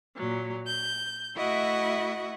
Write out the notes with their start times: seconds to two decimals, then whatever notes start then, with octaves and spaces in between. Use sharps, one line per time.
0.16 A#2 F#3
0.67 G6
1.36 A3 E4 F#4 D#5 E5 F#5